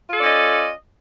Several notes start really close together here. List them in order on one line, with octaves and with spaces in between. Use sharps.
F4 A4 D5 C#4 D#5